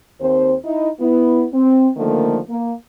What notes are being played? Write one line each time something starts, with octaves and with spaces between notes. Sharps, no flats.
D#2 C4 C5
D#4 E4
B3 E4
C4
D3 D#3 F3 A3 A#3
A#3